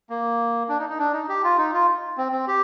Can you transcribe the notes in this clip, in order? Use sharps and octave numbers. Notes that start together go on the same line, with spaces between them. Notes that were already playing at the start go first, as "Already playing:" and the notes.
A#3
D4
D#4
D#4
D4
D#4
G4
F4
D#4
F4
C4
C4
G4